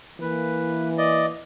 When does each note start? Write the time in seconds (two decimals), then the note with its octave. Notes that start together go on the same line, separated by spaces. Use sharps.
0.21 E3 A#3 B4
0.98 D5 D#5